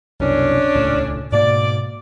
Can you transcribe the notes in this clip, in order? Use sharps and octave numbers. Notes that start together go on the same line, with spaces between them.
C2 F#2 B2 C#4 D4
D#1 C#2 A2
G#2 B2 A#3 D5